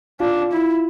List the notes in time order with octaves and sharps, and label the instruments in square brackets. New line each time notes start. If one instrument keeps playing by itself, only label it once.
[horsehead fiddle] D4 [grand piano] F4
[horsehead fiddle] E4